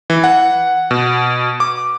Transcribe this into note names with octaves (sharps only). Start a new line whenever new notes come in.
E3
F#5
B2
D6